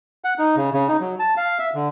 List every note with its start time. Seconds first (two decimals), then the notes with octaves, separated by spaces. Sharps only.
0.24 F#5
0.39 D#4
0.57 C#3
0.74 C#3
0.88 D#4
1.01 F#3
1.20 A5
1.37 F5
1.59 E5
1.75 D3